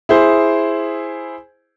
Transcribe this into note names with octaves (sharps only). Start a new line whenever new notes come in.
E4 G#4 C5